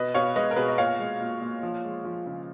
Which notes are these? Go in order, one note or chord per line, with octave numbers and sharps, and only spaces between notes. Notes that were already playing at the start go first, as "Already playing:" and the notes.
Already playing: B2 B4 D#5
B2 C#5 F5
G#3 B4 D#5
A#4
B2 G#4 B4
D#5
A#2 C#5 F5
G#3
A#2
A#2
F3
G#3
F3
C#3